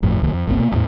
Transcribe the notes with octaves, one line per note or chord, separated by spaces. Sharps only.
G1 F2 A2
D1 C2 D#3 A#3
F2
G1 C2 A#3 C4
B2 A#3 B3
A1 E2 A2